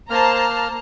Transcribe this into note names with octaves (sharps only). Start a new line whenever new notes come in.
A#3 C5 A5 A#5 F6